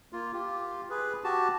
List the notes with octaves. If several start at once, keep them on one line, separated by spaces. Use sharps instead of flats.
A#3 F4
F4 G4
G#4 B4
F#4 G4 A5